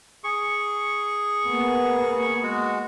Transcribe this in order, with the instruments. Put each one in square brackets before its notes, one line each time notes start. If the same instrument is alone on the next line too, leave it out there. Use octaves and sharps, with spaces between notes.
[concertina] G#4 C#6
[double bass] A#3 B3
[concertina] G#3 F#4